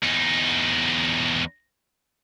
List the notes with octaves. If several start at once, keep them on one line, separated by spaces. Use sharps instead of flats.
E2 D#4